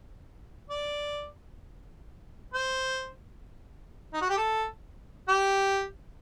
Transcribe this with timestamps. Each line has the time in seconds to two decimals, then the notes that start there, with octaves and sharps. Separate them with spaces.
0.70 D5
2.54 C5
4.13 D#4
4.21 F#4
4.29 G4
4.37 A4
5.28 G4